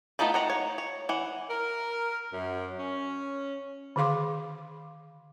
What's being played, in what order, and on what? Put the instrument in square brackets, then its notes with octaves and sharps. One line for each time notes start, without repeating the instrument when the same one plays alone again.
[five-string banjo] A3 B3 D#4 F4 B4
D#3 F#5 A#5
C#5
C#5
E3 F#5
[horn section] A#4
F#2
C#4
[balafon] D3 D#3 G#4 F5 C6 D6